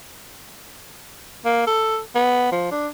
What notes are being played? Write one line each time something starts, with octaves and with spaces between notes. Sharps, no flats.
A#3
A4
B3
F3
D4